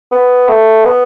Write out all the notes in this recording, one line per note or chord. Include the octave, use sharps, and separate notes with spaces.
B3
A3
B3